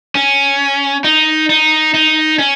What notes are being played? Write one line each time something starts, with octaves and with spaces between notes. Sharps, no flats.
C#4
D#4
D#4
D#4
C#4